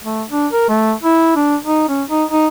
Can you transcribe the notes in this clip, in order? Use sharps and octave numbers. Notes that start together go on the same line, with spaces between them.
A3
D4
A#4
A3
E4
D4
D#4
C#4
D#4
D#4